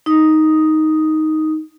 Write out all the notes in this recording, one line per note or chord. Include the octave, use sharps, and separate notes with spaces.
D#4 D#6